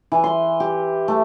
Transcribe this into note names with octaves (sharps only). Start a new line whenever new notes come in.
E3
C6
G4
A3